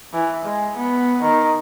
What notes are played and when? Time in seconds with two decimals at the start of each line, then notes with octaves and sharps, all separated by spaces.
0.13 E3
0.45 G#3
0.77 B3
1.22 D#3